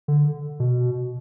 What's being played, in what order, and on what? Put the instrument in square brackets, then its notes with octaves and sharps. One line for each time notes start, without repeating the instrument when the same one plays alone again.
[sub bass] D3
B2